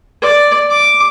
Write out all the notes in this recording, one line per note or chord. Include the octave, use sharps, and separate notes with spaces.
D5
D6